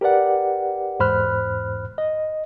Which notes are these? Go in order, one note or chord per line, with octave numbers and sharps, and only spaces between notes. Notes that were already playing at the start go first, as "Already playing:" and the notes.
G4 A#4 B4 D5 F#5
E2 G#2 C5 B5 F6 F#6
D#5